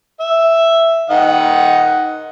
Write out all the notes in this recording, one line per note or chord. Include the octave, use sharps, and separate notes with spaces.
E5
D#3 D#5 F#5